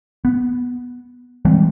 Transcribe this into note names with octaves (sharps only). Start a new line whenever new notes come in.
B3
E3 G3 G#3 C4